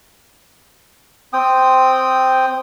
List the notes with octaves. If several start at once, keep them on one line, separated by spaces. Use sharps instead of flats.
C4 G5 D#6